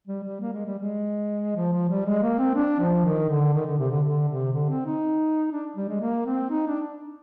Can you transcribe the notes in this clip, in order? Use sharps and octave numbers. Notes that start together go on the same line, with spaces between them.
G3
G3
A#3
G#3
G3
G#3
F3
F3
G3
G#3
A#3
C4
D4
F3
D#3
D3
D#3
D3
C3
D3
D3
C3
D3
C4
D#4
D4
G3
G#3
A#3
C4
D#4
D4